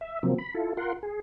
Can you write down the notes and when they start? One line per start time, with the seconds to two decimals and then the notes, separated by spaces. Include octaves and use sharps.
0.01 E5
0.23 C3 F3 F#3 A#3 C4
0.38 B5
0.54 E4 F4 A4
0.77 F4 A#4 F#5 C6
1.03 G#4